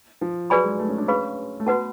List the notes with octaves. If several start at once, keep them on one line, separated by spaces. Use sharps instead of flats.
F3
F#3 G#4 B4 D5 G#5 B5
G#3
A3
C#4
D4
C#4 G#4 B4 F5 B5
A3
B3 F#4 B4 F#5 A5